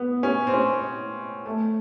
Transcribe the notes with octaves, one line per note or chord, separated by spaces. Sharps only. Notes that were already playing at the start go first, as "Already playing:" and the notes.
Already playing: B3
C#4
C4
C#4
A3